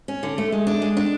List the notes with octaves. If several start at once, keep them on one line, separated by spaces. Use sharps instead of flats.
C#4
D3
A3
G#3
D4
G#3
D4